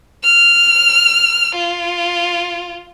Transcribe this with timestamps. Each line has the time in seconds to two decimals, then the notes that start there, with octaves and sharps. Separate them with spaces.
0.24 F6
1.55 F4